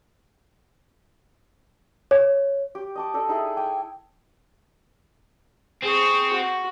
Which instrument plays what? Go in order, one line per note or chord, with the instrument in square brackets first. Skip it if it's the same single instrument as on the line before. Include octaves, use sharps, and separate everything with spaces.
[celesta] C#5
[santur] G4
D#5 A5 D6
D4 G4 A4 D#5
D#4 E4 G#4 A4
G5 G#5 D6
[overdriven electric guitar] C4 [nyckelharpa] G#4 C#6
[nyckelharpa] F#4